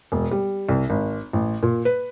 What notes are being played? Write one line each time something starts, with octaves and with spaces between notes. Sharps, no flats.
E1
G3
C2
G#1
A1
A#2
B4